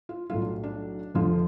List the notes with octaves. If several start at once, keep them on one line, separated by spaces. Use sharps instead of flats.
F4
B1 A2 F#3 F4
D4
D4
F1 F2 D3 F3 F4